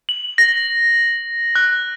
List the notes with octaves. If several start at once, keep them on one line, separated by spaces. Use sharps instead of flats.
F#7
A#6
F#6